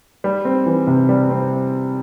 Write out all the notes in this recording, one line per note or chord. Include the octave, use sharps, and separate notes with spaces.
G3
C4
E3
C3
G3
C4